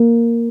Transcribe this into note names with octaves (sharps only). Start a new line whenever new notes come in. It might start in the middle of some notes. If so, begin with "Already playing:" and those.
Already playing: A#3